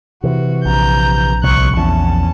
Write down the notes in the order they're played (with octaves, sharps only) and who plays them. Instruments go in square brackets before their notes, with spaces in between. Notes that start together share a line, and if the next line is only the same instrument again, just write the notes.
[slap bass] C3 E3 [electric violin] F#4
[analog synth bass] A#1 [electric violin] A#5 G6
[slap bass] C2 [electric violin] C#6 F#6
[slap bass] E2 [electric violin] C#4 A5